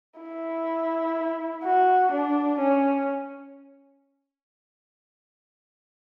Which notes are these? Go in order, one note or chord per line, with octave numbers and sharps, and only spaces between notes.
E4
F#4
D4
C#4